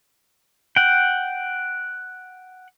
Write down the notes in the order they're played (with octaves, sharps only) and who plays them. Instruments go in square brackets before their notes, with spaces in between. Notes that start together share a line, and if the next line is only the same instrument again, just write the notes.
[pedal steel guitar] F#5 G5